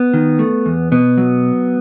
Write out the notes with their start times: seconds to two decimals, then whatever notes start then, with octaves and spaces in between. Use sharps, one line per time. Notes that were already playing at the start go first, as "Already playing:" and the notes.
Already playing: B3
0.14 D#3
0.39 A3
0.66 E2
0.92 B2 B3
1.18 F#3